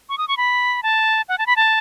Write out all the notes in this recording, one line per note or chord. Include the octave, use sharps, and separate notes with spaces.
C#6
D#6
C#6
B5
A5
F#5
A5
B5
A5